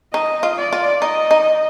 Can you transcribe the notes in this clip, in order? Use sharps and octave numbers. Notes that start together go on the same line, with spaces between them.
D#4 D#5
F4
D5
F4
D#4 D#5
D#4